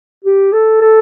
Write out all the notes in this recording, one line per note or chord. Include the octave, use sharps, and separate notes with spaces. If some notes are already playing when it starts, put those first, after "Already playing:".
G4
A4
A4